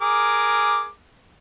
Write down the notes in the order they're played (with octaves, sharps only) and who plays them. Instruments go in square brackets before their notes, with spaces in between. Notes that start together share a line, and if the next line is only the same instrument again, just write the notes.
[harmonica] G#4 A#4 D6